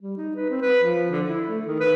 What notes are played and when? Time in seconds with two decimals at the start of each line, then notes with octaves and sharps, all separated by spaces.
0.01 G3
0.17 D#4
0.36 B4
0.50 C4
0.61 B4
0.83 F3
1.11 D3
1.27 E4
1.48 A3
1.67 D#3
1.80 B4